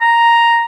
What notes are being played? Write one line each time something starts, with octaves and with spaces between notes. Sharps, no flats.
A#5